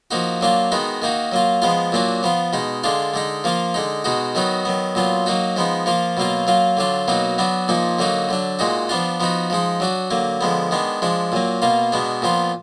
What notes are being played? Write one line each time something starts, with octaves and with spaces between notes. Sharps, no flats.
F3 A#3 D#4 F#4
F#3 A#3 D4 F4
D#3 G#3 B3 D#4 F#4
D#3 A#3 D#4 F#4
F#3 A#3 F4
F3 G#3 B3 F4
A#2 F#3 A#3 D4 F#4
F3 B3 F4
B2 G#3 D#4
D3 G#3 D4 F4
D3 G#3 D#4
F3 A#3 F4
D3 G#3 D#4
B2 G#3 D#4 F#4
D#3 F#3 B3 D#4 F#4
D#3 F#3 B3
A#2 F#3 B3 F4
F#3 A#3 D#4 F#4
F3 G#3 B3 D#4
F3 A#3 F4
B2 F#3 A#3 F4
F#3 A#3 F4
D3 F#3 D4 F4
B2 F#3 A#3 D#4 F#4
F#3 B3 D4 F#4
A#2 F3 A#3 D#4
D3 F#3 A#3 D#4 F#4
D3 F#3 D4
A#2 G#3 D#4 F#4
F3 B3 D4 F4
F3 B3 D#4 F#4
F3 G#3 D#4
F#3 D4 F#4
D3 F#3 A#3
D3 F3 G#3 B3
D#3 G#3 B3 D4
F3 G#3 D4
A#2 F#3 A#3
B2 A#3 F4
B2 G#3 B3 D4
A#2 F3 B3 F4